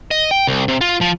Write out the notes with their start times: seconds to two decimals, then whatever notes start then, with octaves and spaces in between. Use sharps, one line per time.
0.11 D#5
0.31 G5
0.47 C2
0.68 C3
0.81 F4
1.01 F3